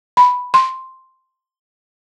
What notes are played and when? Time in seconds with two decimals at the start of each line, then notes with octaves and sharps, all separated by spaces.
0.17 B5
0.54 C6